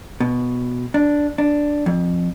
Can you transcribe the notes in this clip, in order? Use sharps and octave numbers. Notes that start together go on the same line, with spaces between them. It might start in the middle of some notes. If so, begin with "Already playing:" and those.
B2
D4
D4
F2